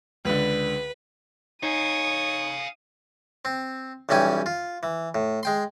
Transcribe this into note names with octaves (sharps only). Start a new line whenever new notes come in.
C#2 D3 B4
D#4 C#5 F5 G#5 D#6
C4
B1 E3 G3 C#4 G5 G#5
F4
E3
A2
G#3 G5 C6